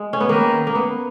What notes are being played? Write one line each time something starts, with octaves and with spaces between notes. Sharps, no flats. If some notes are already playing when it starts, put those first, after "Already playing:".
Already playing: G#3
C#4
B3
D#3 A#3
A#3
B3